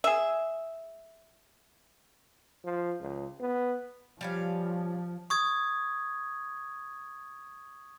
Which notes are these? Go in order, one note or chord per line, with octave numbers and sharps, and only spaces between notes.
G#4 E5
F3
C#2
B3
F3 G3 C#4 F5
C#6 D#6 G#6